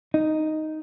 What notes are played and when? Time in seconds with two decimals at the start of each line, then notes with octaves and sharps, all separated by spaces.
0.14 D#4